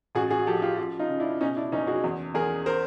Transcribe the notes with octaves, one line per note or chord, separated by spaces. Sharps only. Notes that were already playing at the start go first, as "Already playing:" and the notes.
A1 F#4 G#4
F#4 G#4
F3 G4 A4
F4 G4
F3 F4 G4
D#4 F4
C#3
D4 E4
B2 C#4 D#4
D4 E4
F#1 C#4 D#4
F#4 G#4
E2
E2 G#4 A#4
A#4 C5